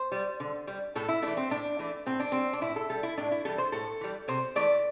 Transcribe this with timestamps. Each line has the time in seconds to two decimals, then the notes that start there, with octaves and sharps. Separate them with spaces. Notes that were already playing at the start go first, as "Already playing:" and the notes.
Already playing: C5
0.12 G3
0.40 D3
0.67 G3
0.95 A2 A4
1.08 E4
1.22 E3 A3 D4
1.37 C4
1.50 A2 D4
1.79 E3 A3
2.06 A2 C4
2.20 D4
2.32 G3 C4
2.53 D4
2.62 A2 E4
2.76 A4
2.90 G3 A4
3.03 E4
3.18 A2 D4
3.32 E4
3.45 E3 G3 A4
3.58 C5
3.72 A2 A4
4.01 E3 G3
4.28 C3 C5
4.56 E3 A3 D5